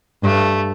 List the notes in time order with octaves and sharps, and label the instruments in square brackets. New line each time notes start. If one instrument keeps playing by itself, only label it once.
[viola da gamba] G2 [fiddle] A3